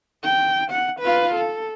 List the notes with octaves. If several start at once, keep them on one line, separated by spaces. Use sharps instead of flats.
G5
F#5
F4 B4
A4